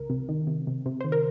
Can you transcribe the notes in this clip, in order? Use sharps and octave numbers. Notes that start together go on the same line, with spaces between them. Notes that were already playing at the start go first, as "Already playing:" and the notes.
Already playing: C#2 A#4
C3
D#3
C3
C3
C3
D#3 C5
A#4